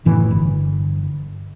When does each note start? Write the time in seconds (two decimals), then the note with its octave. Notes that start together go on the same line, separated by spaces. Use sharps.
0.05 F#1 A2 E3 B3
0.31 G1